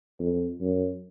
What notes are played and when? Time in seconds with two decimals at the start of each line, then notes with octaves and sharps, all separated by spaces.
0.20 F2
0.61 F#2